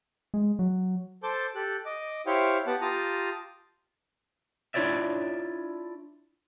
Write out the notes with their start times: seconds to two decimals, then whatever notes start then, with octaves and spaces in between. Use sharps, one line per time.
0.34 G#3
0.59 F#3
1.23 A4 C5 A5 D6 G6
1.55 G4 A4 F#6
1.85 D#5 D6
2.27 E4 G4 C5 C#5 F5 G5
2.67 B3 G4 F#5 A5
2.81 F4 G4 A5 A#5 D#6
4.74 D4 E4 F4 C#5 D5 E5